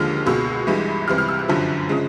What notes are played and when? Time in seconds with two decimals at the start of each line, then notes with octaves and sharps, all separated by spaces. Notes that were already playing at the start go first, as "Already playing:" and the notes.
Already playing: D#2 D3 F3 G#3 F6
0.26 C#2 B2 G#3 E6
0.67 G1 G2 E3 G#3
1.08 C#2 C3 E3 G3 F6
1.18 F6
1.29 E6
1.39 F#6
1.48 G1 F#2 D3 F3
1.89 C#3 F3 G#3